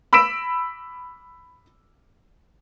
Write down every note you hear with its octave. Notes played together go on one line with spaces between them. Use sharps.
B5 E6 B6 D7 E7